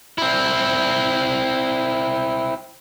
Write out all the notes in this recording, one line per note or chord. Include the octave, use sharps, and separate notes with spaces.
C4 E4